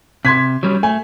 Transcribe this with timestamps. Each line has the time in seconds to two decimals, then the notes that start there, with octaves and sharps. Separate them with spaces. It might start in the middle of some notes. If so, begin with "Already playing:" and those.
0.25 C3 C6 G#6 B6
0.63 F#3 G3 C#4
0.83 A3 G#5